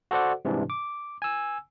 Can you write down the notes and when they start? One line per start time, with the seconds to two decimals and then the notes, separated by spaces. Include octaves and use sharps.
0.11 F#4 A4 C5 D5 F#5
0.45 G#2 C3 E3 G3 D4
0.70 D6
1.22 G#5 E6